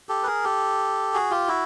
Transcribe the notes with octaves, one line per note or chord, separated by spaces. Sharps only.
G4 A4
B4
G#4 A#4
G4 A4
F#4 G#4
F4 G4
E4 F#4